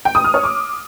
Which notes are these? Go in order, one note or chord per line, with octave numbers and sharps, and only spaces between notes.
G5
D#6
F6
C#5
D6